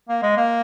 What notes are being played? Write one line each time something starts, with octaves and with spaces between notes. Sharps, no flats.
A#3
G#3
A#3